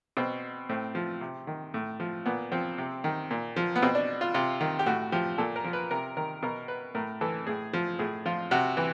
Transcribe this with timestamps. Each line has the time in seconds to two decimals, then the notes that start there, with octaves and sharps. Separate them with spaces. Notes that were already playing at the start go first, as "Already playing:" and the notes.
0.17 B2 C4
0.69 A2 C4
0.95 F3
1.21 C3
1.47 D#3
1.74 A2
2.00 F3
2.26 A#2 B3
2.52 F3 C4
2.78 C3
3.04 D#3
3.31 A#2
3.56 F3
3.76 B3
3.82 B2 C4
3.95 D4
4.21 F4
4.34 C3 F4
4.61 D#3
4.79 G4
4.86 A2 F#4
5.12 F3 G4
5.38 A#2 A4
5.56 A#4
5.64 F3
5.73 B4
5.91 C3 A#4
6.17 D#3 A#4
6.43 B2 A#4
6.68 B4
6.95 A2 A#4
7.21 E3 A4
7.47 A2 G#4
7.73 F3
7.99 A2 G#4
8.26 F3 F4
8.51 C3 F#4
8.77 E3